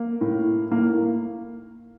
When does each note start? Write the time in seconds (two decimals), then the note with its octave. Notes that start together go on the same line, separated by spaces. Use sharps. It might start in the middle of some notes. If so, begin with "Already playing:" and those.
Already playing: A#3
0.21 A2
0.71 A2 A#3